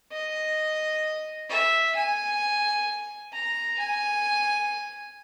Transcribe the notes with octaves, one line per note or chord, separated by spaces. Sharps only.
D#5
E5
G#5
A#5
G#5